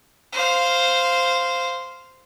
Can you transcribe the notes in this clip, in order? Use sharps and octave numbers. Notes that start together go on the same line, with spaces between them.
C5 F5